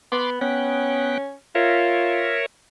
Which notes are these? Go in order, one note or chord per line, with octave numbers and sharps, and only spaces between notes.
B3 B5 C6 D6
B3 C#4 G5 F#6
F4 A#4 C#5 E5